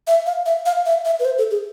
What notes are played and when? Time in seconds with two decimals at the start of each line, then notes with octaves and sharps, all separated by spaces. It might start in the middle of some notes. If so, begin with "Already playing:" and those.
0.07 E5
0.26 F5
0.46 E5
0.66 F5
0.86 E5
1.05 E5
1.20 B4
1.25 C5
1.38 A4
1.51 G#4